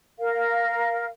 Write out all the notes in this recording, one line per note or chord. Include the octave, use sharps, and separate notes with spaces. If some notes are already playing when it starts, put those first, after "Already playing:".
A#4 F5